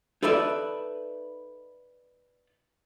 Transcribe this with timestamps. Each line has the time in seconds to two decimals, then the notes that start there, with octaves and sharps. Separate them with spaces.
0.23 D#4 A4 B4 D5 E5